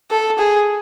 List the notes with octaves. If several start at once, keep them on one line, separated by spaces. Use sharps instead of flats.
A4
G#4